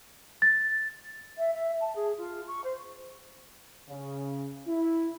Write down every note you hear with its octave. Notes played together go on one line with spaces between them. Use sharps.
A6
E5
E5
A5
G#4
F4
C#6
C5
C#3
E4